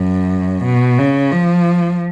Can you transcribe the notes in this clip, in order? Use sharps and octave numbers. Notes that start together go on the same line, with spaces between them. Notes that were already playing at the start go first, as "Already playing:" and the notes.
Already playing: F#2
B2
C#3
F3